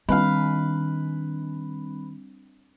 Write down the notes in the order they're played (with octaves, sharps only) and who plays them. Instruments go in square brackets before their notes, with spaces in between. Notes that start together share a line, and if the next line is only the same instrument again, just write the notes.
[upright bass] D#3 [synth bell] G3 C4 D4 [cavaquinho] B4 F5